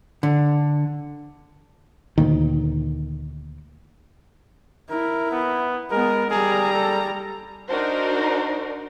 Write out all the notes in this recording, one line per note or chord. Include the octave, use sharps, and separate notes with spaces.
D3
D2 A#2 D#3
E4 A#4
B3
G#3 B3 A#4
G3 G#4 A#5
A4
D4 D#4 F#4 A#4 C5